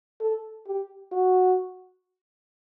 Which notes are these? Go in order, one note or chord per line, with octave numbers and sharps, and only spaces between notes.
A4
G4
F#4